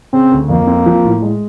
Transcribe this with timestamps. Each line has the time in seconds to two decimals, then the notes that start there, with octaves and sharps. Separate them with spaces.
0.13 C#3 C4
0.31 D2
0.49 F2 A#3
0.67 C4
0.86 F3
1.05 A2
1.23 G#3